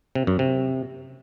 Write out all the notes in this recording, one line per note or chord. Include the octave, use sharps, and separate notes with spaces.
C3
F#2
C3